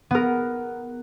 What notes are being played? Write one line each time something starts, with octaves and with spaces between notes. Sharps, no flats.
B3 A#4